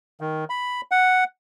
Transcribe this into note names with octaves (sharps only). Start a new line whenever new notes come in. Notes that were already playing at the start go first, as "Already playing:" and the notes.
D#3
B5
F#5